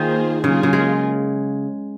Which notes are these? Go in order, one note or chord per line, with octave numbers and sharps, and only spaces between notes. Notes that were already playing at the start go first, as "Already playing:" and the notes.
Already playing: D#3 A#3 F4 G#4 C5
C#3 F#3 A#3 F4 G#4
C#3
G#3